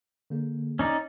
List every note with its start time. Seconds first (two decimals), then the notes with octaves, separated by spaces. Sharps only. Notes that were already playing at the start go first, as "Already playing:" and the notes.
0.30 D3 A#3 G#4
0.79 C#4 D#4 D5